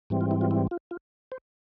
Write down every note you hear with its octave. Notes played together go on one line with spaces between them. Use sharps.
G#2 E3 G3 C4
F4
E4
F4
E4
F4
F4
C5